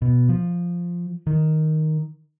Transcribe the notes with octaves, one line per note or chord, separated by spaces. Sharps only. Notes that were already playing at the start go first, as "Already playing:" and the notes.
B2
F3
D#3